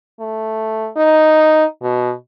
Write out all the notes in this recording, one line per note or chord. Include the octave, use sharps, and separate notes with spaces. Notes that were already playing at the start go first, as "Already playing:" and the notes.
A3
D#4
B2